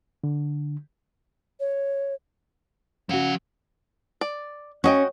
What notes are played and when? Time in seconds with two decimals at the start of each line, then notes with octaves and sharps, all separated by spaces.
0.24 D3
1.60 C#5
3.09 C#3 F3 F#4 F#5
4.21 D5
4.84 C#4 F#4 D#5 G5